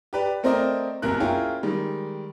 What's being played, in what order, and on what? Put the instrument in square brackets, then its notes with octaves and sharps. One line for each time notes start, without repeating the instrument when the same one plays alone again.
[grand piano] G4 B4 D5
A3 C4 A#4 C5 D5 D#5
F#1 B1 C3 A#4 F#6
C#4 E4 F4 G#4 A#4 G5
D#3 G3 G#3